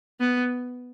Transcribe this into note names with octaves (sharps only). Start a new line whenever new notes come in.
B3